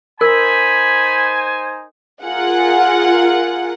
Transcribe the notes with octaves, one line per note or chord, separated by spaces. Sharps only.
D#4 A#4 C5 G#5 B5
F4 G#4 A#4 F#5